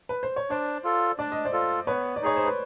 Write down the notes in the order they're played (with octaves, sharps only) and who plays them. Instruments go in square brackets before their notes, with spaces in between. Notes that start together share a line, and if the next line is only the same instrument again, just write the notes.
[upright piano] B4
C5
C#5
[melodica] D4 [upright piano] C5 D5
[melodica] F4 A4
[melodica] D4 [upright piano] D5
[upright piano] D#5
C5 D5
[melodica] F4 A4
[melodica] B3 [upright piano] B4 C#5
[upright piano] D5
[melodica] D#4 G#4 [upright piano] C#5
[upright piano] C5
B4